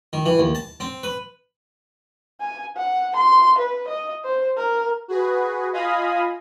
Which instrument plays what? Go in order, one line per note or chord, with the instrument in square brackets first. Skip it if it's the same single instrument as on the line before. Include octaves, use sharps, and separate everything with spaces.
[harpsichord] D#3
E3
D#2
A5
C4
B4
[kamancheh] G#5
F#5
C6
B4
D#5
C5
A#4
[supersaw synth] F#4 G#4 B4
F4 D#5 F5 G#5 B5 D#6